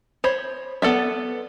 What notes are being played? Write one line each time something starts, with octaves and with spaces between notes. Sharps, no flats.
C5 C#5 B5
B3 A4 D5 E5